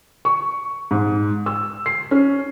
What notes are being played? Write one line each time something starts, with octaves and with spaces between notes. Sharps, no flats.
C#6
G#2
E6
C7
C#4